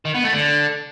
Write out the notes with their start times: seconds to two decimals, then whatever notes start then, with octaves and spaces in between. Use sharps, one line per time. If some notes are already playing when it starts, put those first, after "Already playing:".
0.05 D#3
0.14 B3
0.24 A3
0.33 D3